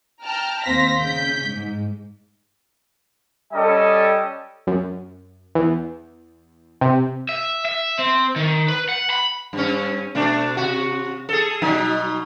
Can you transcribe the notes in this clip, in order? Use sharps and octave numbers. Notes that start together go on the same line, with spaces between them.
G5 A5 A#5 F6
D#2 C4 C5 F5 A#6 B6
C#3 G6 B6
G#2
G3 C#4 A4 D#5 G5
F#2
E2
C3
E5
E5
C4
D#3
B4
F#5
B5
G2 C#4
B2 A3 D4
C3 F#4
G#4 A4
B2 F#3 D#4